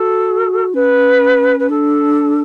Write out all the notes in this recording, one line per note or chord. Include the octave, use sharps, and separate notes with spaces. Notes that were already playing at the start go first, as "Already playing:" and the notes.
Already playing: F#4 A4
C#4 B4
B4
D4 A4